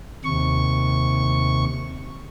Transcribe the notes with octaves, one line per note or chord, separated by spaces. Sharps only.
D#2 C3 C#6